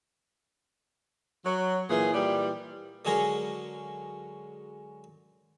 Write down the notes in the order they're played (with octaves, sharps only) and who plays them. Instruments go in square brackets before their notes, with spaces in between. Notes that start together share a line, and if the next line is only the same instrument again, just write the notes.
[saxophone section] F#3
A#2 E3 G#4
A#2 E3 G3
[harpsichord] D3 F#3 G#3 C#4 G#4 A#4